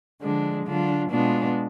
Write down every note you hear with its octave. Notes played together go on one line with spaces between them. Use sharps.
D3 F3 G#3 D4
D3 F#3 D4 F4
B2 G#3 B3 D4 F4